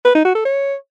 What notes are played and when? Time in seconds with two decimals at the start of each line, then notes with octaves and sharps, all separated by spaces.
0.05 B4
0.15 D#4
0.25 F#4
0.35 A4
0.45 C#5